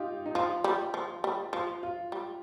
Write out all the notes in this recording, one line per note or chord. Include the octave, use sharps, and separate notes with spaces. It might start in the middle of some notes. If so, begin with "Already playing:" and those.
Already playing: D#4 F4 G4
D#4
F3 F4
G3
F3
G3
F3 F4
F4
G3